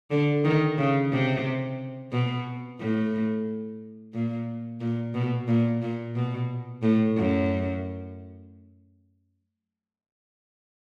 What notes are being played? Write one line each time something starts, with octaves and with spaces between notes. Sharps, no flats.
D3
D#3
C#3
C3
B2
A2
A#2
A#2
B2
A#2
A#2
B2
A2
F#2